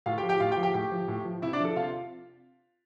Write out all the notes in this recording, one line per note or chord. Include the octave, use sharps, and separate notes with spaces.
A2 F4 F5
G4 G5
F3
G4 G5
A2 F4 F5
G4 G5
F3
G4 G5
A2 G4 G5
F3
A2
F3
C3 E4 E5
D4 D5
F3 A4
C3 F4 F5